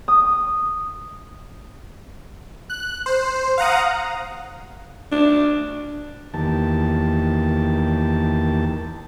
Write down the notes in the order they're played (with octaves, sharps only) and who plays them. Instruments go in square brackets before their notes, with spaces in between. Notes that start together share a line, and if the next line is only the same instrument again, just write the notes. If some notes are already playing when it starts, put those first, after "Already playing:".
[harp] D#6
[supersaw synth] F#6
C5
F5 F#5 A#5 D#6
[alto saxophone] D4
[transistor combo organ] E2 D#3 A#3 G4 A5